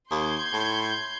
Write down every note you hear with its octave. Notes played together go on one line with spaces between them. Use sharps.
D#2 C6 G6 G#6
A2